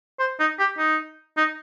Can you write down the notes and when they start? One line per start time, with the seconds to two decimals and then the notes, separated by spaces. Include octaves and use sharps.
0.19 C5
0.40 D#4
0.59 G4
0.78 D#4
1.37 D#4